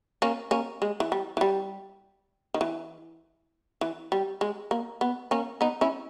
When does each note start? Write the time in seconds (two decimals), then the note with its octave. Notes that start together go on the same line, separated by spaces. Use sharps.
0.22 A#3 C#4
0.51 A#3 C#4
0.82 G#3
1.00 E3
1.12 G3
1.37 E3
1.41 G3
2.54 D#3
2.61 E3
3.81 E3
4.12 G3
4.41 G#3
4.71 A#3
5.01 B3
5.31 A#3 C#4
5.61 B3 D#4
5.81 C#4 E4